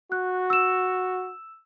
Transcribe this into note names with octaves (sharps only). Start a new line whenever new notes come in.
F#4 F#6
E6 E7